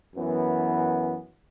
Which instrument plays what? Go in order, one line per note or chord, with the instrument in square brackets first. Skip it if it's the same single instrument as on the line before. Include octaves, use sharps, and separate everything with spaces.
[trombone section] F#2 E3 B3